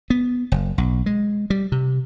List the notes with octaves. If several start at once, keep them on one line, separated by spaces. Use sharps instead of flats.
B3
F#1
B1
G#3
G3
C3